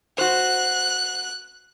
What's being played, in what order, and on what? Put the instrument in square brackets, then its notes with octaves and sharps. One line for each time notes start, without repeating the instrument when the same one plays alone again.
[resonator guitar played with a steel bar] F#4 C5 [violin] F#6